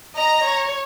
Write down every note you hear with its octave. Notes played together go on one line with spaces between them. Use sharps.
D#5 A#5
C#5